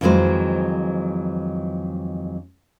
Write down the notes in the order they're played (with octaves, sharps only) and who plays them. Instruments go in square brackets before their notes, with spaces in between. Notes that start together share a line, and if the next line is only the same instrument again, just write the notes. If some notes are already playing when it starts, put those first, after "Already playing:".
[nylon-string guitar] F2 D#3 E3 F#3 G#3 C5